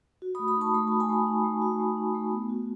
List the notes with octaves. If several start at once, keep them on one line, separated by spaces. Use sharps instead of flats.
F#4
B5 D#6
A3
B5 D#6
D#4 A5 C#6
A3 B5
F#4 A5
G#5 B5
A3
D#4
A3
F#4
A3
D#4
A3
B3
F#4